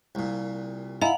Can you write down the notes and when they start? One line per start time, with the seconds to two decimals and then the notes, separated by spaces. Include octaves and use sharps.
0.15 C2 A#2
1.02 E4 D#5 F5 F#5 G#5 A#5